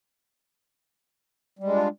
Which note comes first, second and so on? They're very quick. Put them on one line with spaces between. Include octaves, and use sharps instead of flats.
G3 G#3 D4 F4